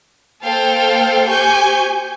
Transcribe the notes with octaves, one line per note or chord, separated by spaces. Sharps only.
A#3 A4 C5 F5 G5
G4 C5 G#5 C#6 G6